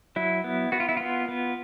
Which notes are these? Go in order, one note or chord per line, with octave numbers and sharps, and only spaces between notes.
F#3 E4
B3
B3 F#4
F4
E4
B3 F4
B3